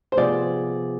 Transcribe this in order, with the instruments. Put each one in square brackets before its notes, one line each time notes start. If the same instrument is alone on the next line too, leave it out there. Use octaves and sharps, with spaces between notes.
[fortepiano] C5
[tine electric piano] C3 F3 B3 F4 G#4 [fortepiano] D5